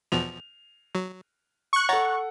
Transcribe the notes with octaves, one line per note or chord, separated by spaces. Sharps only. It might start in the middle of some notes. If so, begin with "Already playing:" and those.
E2 B2 F3 F7
F#3
C#6 F#6
A4 C#5 F#5 A#5 A6